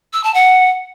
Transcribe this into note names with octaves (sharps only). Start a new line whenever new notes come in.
E6
A5
F#5